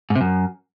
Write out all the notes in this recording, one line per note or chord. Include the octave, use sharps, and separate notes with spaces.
G#2
C3
F#2